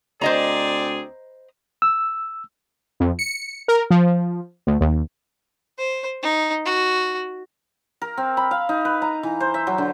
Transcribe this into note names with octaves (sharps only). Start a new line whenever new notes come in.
D2 C4 G#4 C5 D5 D#5 A#5
E6
F2
C#7
A#4
F3
D2
D#2
C5
D#4
F#4
A#4
C4
B5
F5
D#4
B4
A#5
E3
C5
E5
F#3
D3